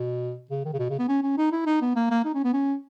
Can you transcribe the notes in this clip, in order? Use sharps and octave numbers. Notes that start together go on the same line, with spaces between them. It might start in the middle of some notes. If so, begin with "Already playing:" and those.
Already playing: B2
C#3
D#3
C#3
B2
C#3
B3
C#4
C#4
D#4
E4
D#4
B3
A#3
A#3
D#4
C#4
B3
C#4